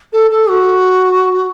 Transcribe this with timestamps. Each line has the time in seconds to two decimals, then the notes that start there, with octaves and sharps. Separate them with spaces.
0.12 A4
0.30 A4
0.49 F#4